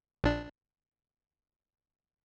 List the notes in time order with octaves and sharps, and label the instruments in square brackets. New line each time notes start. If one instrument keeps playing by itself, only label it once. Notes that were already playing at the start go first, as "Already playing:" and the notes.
[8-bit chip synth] A#1 D4